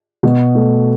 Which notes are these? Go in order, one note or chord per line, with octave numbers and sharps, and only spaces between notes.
B2
A3